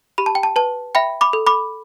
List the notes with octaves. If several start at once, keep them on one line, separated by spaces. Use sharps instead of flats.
G4 B5
A5
G5
A5
B4 A5
E5 G5 B5
B5 D6
A4
B5 D6